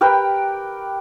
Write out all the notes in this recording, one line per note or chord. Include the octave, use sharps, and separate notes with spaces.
G4 A#4 B4 G5